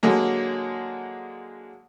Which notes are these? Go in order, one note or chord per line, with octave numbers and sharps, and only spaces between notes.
D3 F#3 G#3 A#3